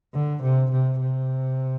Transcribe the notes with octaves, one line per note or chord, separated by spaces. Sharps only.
D3
C3
C3
C3